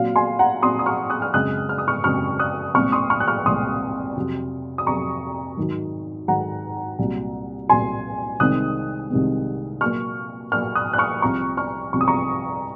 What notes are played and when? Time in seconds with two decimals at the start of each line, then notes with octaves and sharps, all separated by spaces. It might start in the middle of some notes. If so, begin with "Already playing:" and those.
Already playing: A#2 F#3 C4 F5
0.16 G#5 C6
0.39 F#5 A#5
0.63 A#2 F#3 C4 C6 D#6
0.79 D#6
0.86 C#6 F6
1.10 D#6 F#6
1.22 F6
1.34 F#2 C#3 G#3 C4 D#6 F#6
1.69 F6
1.78 D#6
1.88 C#6 F6
2.04 F#2 C#3 G#3 C4 C#6 F6
2.39 D#6 F#6
2.75 C2 A#2 G#3 C4 C#6 F6
2.92 C6 D#6
3.10 C#6 F6
3.20 F#6
3.28 C#6 F6
3.45 C2 A#2 G#3 C4 C6 D#6
4.16 F2 C3 F#3
4.78 D#6
4.86 F2 C3 F#3 A#5 C#6
5.57 G#2 D#3 F#3
6.28 G#2 D#3 F#3 F#5 A#5
6.99 C2 A#2 F#3
7.69 C2 A#2 F#3 G#5 C6
8.40 C2 C3 D#3 G#3 C4 D#6 F#6
9.10 C2 C3 D#3 G#3 C4
9.81 A#2 F#3 A#3 C#6 F6
10.52 A#2 F#3 A#3 C#6 F6
10.75 D#6 F#6
10.93 F#6
10.98 C#6 F6
11.22 C2 C3 F3 C4 A#5 C#6
11.57 C#6 F6
11.93 C2 C3 F3 C4 C#6
12.01 D#6
12.08 A#5 C#6